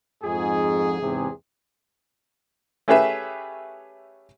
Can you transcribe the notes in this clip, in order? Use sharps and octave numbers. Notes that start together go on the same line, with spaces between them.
F2 G#2 G#4
E2 G#2 C3
A3 C#4 G4 G#4 B4 E5